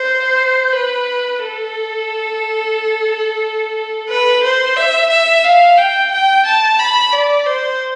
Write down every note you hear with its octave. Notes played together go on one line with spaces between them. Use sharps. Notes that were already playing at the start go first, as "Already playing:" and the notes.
Already playing: C5
B4
A4
B4
C5
E5
E5
F5
G5
G5
A5
B5
D5
C5